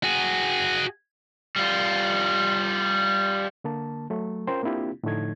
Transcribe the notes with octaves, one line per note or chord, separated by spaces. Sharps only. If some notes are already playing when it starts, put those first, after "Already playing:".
F#4 G#4
G3 F4
D3 A#3 A5
F#3 A3
C#4 F4 A#4 C5 G5
A#3 C4 D4 E4 F4 G4
A2 D3 F3 A3 D#4 G#6